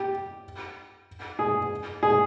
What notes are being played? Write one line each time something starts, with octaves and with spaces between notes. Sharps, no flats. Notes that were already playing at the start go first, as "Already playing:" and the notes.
Already playing: G4
G#4
G#4